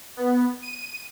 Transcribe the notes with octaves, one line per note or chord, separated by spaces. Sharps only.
B3
D#7